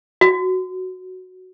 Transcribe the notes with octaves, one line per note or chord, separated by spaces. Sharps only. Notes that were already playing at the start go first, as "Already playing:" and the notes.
F#4